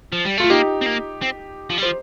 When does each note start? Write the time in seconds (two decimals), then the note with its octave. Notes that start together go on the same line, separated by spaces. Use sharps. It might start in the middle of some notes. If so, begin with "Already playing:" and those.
0.12 F3
0.25 G3
0.38 A3 F4
0.50 A#3 D#4 G4
0.81 C4
0.86 A#3
1.22 C4
1.70 F3
1.78 G3
1.83 F3 C5